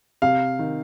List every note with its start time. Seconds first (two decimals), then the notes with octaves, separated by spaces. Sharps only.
0.22 C3 F5
0.59 D#3